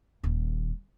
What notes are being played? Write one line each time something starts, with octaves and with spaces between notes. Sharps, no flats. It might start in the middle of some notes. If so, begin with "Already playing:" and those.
D#1 D#2